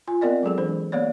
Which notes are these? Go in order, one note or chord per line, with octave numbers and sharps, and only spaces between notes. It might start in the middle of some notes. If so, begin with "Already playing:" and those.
F4 G#5
B3 C4 A#4 D5 D#5
F#3 G#3 G#4 A4
E3 D4 C5
A#3 B3 C#5 D5